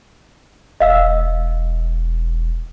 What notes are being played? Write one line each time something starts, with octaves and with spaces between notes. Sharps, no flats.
E1 D#5 F5 E6